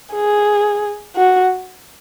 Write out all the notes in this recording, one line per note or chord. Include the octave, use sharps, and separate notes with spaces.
G#4
F#4